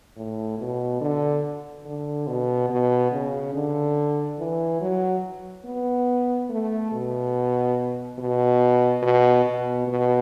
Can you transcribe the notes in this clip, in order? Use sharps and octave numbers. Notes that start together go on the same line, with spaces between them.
A2
B2
D3
D3
B2
B2
C#3
D3
E3
F#3
B3
A3
B2
B2
B2
B2
B2